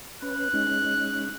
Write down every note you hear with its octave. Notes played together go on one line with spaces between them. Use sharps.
C#4 B4 F#6
G#3 C#4 D#4